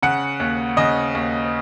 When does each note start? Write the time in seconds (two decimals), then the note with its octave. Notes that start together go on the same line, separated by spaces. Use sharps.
0.03 C#3 F#5
0.40 D#2
0.77 C#3 D#5
1.15 D#2